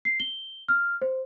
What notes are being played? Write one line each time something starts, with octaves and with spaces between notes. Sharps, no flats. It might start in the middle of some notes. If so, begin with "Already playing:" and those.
C7
G7
F6
C5